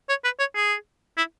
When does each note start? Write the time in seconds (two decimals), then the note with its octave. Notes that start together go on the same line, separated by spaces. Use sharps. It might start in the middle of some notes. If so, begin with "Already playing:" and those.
0.09 C#5
0.24 B4
0.39 C#5
0.55 G#4
1.17 E4